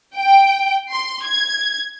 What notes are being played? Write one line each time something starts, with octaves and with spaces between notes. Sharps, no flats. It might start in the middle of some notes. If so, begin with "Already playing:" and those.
G5
C6
G#6